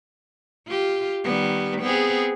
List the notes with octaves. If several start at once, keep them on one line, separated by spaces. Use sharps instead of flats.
F4 G4
D#3 G3 B3
B3 C4 G#4